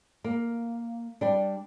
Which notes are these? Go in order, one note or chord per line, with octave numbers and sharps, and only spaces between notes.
A#3
G3 D4